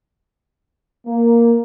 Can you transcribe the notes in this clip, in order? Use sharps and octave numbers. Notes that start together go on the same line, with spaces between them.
A#3